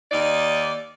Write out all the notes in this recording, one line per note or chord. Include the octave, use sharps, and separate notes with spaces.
D#2 D#4 D5